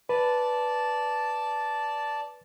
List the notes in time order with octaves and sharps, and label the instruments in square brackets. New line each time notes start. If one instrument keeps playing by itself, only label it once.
[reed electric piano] B4 [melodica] D5 A5